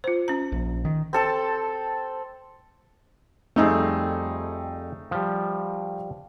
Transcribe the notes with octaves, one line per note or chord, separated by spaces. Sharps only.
F4 C5
C#4 A#5
A#1
D#3
C4 A4 A5
F2 G3 A3 C4 D#4 G#4
F3 G3